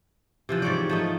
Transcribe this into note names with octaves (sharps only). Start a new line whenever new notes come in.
C3 E3 F3
G#2 G3 C#5 D5
F3 A3 D#4